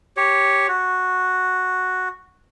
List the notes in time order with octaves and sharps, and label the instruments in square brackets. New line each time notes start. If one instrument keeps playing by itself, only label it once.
[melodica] G4 C#5
F#4